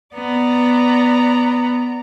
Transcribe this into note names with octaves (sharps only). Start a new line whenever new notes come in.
B3 D5 A#5